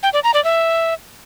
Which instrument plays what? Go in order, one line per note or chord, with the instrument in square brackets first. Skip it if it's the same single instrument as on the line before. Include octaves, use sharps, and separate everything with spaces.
[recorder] G5
D5
A#5
D5
E5